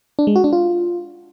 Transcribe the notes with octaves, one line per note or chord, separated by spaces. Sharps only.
D4
G#3
F#4
D4
F4